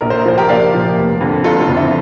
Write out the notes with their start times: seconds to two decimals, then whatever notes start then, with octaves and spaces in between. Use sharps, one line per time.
0.01 A#1 A#4
0.10 C5
0.19 A#4
0.26 A#2 F3 A#3 C5
0.38 G4 A#4
0.49 A#1 D5 F5
0.73 A#2 F3 A#3
0.97 F1
1.21 F2 D3
1.44 F1 F4 A4
1.61 F4
1.69 F2 D3
1.77 E4